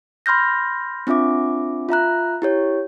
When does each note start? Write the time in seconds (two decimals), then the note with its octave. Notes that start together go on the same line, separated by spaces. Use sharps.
0.26 B5 C6 F6 G6 A#6
1.07 C4 D4 F4 E5 D6
1.89 F4 E5 A#5 F#6
2.42 E4 G4 C#5